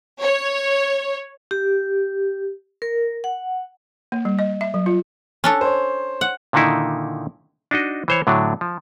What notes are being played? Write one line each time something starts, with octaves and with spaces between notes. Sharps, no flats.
C#5
G4
A#4
F#5
A#3
G3
D#5
E5
F#3
F4
C#4 D4 A4
C5 C#5
F#5
A#2 D3 D#3 D#4 E4
D4 D#4 F#4 D#5
E3 C5 C#5
A2 D3 F#3 D4
F3